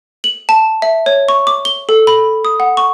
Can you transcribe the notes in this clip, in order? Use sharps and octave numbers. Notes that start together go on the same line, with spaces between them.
F#7
A5
E5
C#5
C#6
D6
G7
A4
B5
D#6
F#5
C#6